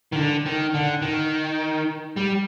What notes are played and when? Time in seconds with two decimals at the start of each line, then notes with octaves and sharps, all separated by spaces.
0.13 D#3
0.16 D3
0.46 D#3
0.74 D3
1.02 D#3
2.17 G3